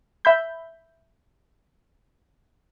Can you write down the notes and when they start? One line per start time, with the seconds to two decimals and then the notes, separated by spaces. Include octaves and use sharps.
0.25 E5 B5 G6